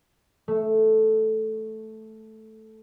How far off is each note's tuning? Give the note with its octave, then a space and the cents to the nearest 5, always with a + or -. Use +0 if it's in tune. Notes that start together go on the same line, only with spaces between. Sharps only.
A3 -5